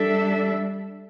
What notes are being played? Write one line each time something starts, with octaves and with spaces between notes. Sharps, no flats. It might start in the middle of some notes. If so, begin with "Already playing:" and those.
Already playing: G3 D4 A4 E5